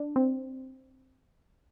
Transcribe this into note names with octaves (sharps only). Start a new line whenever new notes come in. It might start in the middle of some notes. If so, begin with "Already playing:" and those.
Already playing: D4
C4